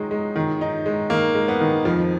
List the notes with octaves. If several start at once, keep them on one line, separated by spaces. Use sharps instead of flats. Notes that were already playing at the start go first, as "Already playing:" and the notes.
Already playing: D#3 F#3 G#3 D#4
G#3
D#3
D#4
G#3
D#3 A#3
G#3
B3
D#3
F2 F3